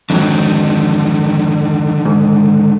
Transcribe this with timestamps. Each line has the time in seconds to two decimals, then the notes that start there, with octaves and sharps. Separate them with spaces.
0.10 F2 G#2 D3 D#3 F#3
2.05 G#2